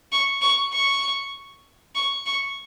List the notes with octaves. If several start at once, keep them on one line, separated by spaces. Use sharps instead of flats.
C#6
C#6
C#6
C#6
C#6